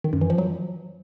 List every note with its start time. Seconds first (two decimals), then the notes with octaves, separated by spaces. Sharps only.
0.04 D#3
0.13 F#2
0.21 E3
0.30 F3
0.38 F#3